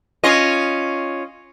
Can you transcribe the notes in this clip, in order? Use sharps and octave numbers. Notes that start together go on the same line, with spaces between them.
C#4 F4 D#5